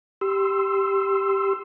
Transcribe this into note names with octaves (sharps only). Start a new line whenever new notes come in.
G4 C6 E6